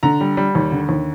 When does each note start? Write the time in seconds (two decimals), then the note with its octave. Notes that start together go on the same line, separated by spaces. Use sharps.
0.03 D3 A#5
0.21 G3
0.37 G3
0.55 D#2
0.72 D3
0.89 D#2